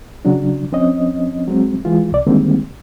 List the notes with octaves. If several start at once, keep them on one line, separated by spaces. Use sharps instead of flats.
C#3 F#3 D4
F3 C4 C#4 D#5
F#3 G#3 C4
E3 G#3 F4
C2 D5
D3 D#3 G3 G#3 A#3 C4